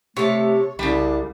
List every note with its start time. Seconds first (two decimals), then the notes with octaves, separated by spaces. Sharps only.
0.17 C3 A3 A4 C#5
0.79 C2 C#3 G3 D4